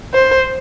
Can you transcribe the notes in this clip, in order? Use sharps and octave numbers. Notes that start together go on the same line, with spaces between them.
C5